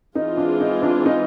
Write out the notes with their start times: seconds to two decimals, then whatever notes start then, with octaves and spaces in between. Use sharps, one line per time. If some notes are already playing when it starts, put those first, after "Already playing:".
0.15 E3 G#3 C4 D#4 F4 G#4
0.37 D4
0.61 D#4
0.83 D4
1.06 D#4